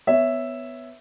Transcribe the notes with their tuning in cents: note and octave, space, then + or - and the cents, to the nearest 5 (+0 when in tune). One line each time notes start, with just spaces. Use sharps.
B3 +15 C#5 +5 E5 +0